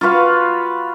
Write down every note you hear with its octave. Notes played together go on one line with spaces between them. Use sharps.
F4 F#4 B4 F5